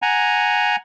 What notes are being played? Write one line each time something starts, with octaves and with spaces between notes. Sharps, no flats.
F#5 G#5 A#5